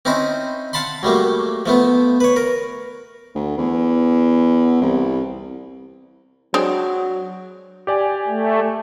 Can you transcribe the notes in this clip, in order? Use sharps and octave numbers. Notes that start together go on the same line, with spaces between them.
C4 C#4 D#4 E4 C5
F5 F#5 A5 B5 C6
F#3 G3 A3 A#3
F3 A3 B3
B4 C#5
A#4
D2
E2
C2
F#3 G#3 C4 D4
G4 D5 G#5
A3